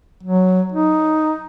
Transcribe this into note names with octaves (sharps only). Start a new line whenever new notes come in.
F#3
D#4